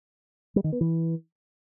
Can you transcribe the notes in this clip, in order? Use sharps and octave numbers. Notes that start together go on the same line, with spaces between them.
G3
D#3
B3
E3